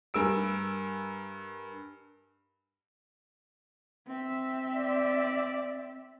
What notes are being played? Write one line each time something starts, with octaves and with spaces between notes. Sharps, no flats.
G2 A#4 G#5 E6 D7
C4 E5
D5